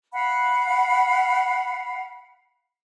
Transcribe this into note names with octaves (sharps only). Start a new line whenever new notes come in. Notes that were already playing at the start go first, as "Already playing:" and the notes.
F5 F#5 B5